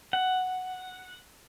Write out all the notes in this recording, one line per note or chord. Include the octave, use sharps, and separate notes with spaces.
F#5